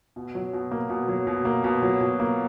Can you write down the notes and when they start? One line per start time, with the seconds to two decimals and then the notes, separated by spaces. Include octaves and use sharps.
0.16 B2
0.35 F#3
0.53 B2
0.71 A#3
0.90 B2
1.08 F#3
1.27 B2
1.45 A#3
1.64 B2
1.82 F#3
2.01 B2
2.20 A#3